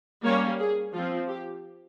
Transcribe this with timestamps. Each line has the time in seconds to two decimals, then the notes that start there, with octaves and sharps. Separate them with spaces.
0.25 G3 A#3 C#4 C#5
0.59 G#4
0.94 F3 C4 F4
1.28 G4